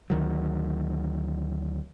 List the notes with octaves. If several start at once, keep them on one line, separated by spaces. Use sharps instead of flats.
D2 D#3 F#3